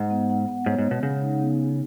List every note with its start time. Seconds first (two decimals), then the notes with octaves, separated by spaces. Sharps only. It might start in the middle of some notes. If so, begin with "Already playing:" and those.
Already playing: G#2 F#5
0.10 B3
0.30 F#5
0.48 B3
0.66 G#2 C#5
0.78 G#2
0.84 G#3
0.91 B2
1.03 C#3 F#5
1.21 D#4
1.41 B3
1.58 B3